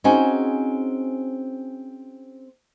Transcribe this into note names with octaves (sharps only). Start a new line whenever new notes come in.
C4 C#4 D#4 F#4 G#4 C5